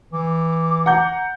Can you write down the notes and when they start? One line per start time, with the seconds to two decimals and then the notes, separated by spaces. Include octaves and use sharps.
0.13 E3 D6
0.86 F#5 A#5 G6